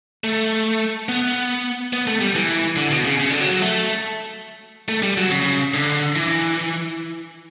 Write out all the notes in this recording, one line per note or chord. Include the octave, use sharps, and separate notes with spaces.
A3
B3
B3
A3
G3
E3
D3
B2
C#3
C#3
D3
F#3
F#3
A3
A3
G3
F#3
C#3
D3
E3